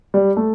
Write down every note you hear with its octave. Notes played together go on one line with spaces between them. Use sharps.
G3
A3